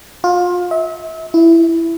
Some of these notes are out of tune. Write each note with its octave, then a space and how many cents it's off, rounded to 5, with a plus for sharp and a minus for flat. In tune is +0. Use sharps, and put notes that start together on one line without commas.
F4 +25
E5 -35
E4 +10